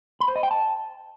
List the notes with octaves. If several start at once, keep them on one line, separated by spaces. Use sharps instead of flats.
B5
C5
D#5
G5
A5